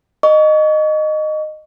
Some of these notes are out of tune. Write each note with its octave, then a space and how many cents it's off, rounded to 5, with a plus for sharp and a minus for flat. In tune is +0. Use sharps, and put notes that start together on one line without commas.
D#5 -15 C#6 +35